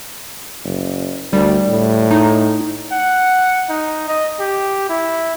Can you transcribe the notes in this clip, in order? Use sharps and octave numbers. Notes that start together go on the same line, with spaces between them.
F#1
D2 G3
A2
D#4
F#5
D#4
D#5
G4
E4